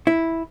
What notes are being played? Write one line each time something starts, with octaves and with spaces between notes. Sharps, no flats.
E4